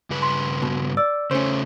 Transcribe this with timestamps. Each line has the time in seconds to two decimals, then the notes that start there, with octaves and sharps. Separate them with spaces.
0.10 G2 C#3 B4
0.22 C6
0.62 B2
0.97 D5 E6
1.31 C#3 A3 C#4 C5